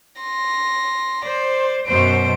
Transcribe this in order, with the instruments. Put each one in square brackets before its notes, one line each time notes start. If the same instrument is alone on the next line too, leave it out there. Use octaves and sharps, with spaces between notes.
[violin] C6 A#6
[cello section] C5 [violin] D5
[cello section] F#2 B2 C5 [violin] D7